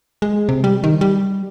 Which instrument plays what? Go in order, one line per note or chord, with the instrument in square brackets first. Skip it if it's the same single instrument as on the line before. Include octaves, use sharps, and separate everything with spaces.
[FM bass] G#3
C3
G3
D#3
G3